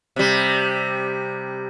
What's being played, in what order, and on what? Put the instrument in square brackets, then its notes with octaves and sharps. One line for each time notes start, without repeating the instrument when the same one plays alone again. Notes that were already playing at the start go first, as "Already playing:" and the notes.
[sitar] C3 G3